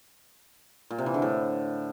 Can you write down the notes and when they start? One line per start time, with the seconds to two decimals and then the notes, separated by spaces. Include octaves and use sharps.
0.91 A#2
0.98 C3
1.06 E3
1.14 D3
1.22 A2